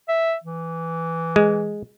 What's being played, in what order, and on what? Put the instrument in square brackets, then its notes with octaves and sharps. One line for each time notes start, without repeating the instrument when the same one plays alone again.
[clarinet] E5
E3
[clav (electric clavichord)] G#3